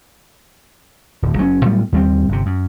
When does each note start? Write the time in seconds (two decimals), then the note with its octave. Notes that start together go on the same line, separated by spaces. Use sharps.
1.22 D1
1.37 F#1 F#3 C4 C#4
1.65 A2 F#3 G3 B3
1.92 D#2 G3 C4
2.29 G1 C3
2.46 F#2